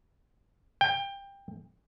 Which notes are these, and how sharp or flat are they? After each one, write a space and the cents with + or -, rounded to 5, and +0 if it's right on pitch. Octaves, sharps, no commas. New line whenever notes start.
G5 +20